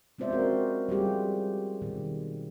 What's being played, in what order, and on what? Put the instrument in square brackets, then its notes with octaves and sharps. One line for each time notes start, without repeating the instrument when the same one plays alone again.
[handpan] G#3 C4 F4 C5 D5 E5
C4 C#4 F#4 A#4
G3 F4 G4 G#4
B2 D#3